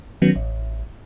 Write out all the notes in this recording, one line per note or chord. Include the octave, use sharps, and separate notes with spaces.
D#3 F#3 B3 C#4
A1